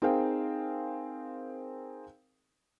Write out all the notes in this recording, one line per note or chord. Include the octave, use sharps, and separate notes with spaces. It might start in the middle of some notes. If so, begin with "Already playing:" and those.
C4 D#4 G#4 A#4 F5 G5